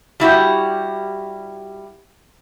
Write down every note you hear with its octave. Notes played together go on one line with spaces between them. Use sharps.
G3 E4 F#4 G4